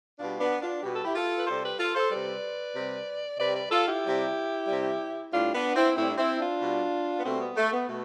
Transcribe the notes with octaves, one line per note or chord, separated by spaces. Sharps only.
B2 G3 D4 F4
B3 D4
D4 F4
B2 G3 G4
A4
E4 G4
F4 A4
B4
C3 G3 A4 C5
G4 B4
F4 A4
A4 C5
C3 G3 B4 D5
C3 G3
C3 G3 B4 D5
B4 D5
F4 A4
E4 G4
C3 G3
C3 G3
A2 G3 D4 F4
B3 D4
C4 E4
A2 G3 C4 E4
D4
C4 E4
D4 F4
B2 G3
B3
B2 G3 A3 C4
B3
A3
B3
B2 A3